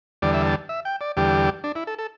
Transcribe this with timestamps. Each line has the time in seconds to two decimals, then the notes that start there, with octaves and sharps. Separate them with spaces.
0.22 E2 D3 G3 D5
0.34 E5
0.46 A5
0.69 E5
0.85 G5
1.01 D5
1.17 E2 D3 G3 G4
1.64 D4
1.75 E4
1.87 A4
1.99 A4